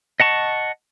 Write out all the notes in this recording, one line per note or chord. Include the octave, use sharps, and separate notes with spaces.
D#5 F#5 A5 C#6